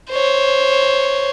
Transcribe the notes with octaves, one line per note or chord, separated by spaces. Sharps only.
C5 C#5